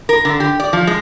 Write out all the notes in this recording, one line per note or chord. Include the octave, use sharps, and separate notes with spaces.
A#4
D3
G4
D5
F3
G#3